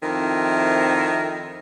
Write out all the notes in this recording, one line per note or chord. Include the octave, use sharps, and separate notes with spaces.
F2 D#3 C4 E4 A#4 E5